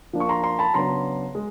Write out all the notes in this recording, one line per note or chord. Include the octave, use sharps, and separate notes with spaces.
F3 A#3 D4
C#6
A#5 C6
A#5 C6
A5 B5
C#3 F#3 B3 D4 A#5 C6
G#3